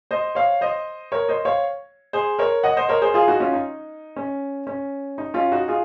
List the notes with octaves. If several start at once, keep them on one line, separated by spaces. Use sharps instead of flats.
C5 D#5
C#5 F5
C5 D#5
A#4 C#5
C5 D#5
C#5 F5
G#4 C5
A#4 C#5
D#5 F#5
C5 D#5
A#4 C#5
G#4 C5
F4 G#4
D#4 F#4
C#4 F4
D#4
C#4
C#4
D#4
C#4 F4
D#4 F#4
F4 G#4